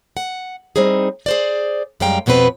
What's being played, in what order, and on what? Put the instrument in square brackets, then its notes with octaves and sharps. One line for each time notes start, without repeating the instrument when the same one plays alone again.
[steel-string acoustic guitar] F#5
G3 C4 D#4 G#4
G#4 C5 D5
F#2 G3 G#3 F5 G5 A#5
F2 B2 B3 C4 B4